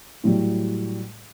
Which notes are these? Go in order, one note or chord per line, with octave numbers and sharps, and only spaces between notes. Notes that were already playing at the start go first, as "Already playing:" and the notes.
A2 F#3 G3